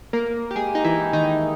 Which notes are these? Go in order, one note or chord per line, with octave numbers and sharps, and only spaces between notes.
A#3 A#4
G4
G#3 G#4
D#4
E3 E4
D#3 D#4